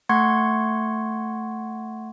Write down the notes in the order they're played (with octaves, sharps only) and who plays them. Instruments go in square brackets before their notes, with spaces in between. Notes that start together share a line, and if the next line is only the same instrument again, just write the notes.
[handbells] A3 F#5 C6 C#6 G#6